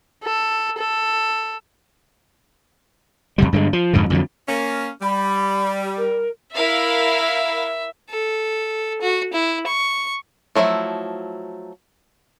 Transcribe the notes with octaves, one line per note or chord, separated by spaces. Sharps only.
A4
A4
F2 C#3 G3
G2 D3 F#3 G#3
F3
F2 G#2 B2 D3
F2 D3 D#3 F#3
A#3 C#4
G3 B5
A#4
E4 A#4 E5 F5
A4
F#4
E4
C#6
F3 F#3 A3 E4 E5